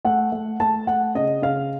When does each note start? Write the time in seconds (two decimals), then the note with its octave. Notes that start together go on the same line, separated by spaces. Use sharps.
0.05 A3 F#5
0.32 A3
0.60 A3 A5
0.87 A3 F#5
1.15 C#3 D#5
1.42 C#3 F5